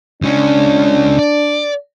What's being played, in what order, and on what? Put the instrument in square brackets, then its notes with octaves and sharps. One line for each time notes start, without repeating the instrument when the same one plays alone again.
[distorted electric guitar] C#2 C#4 [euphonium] D4
[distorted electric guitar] D5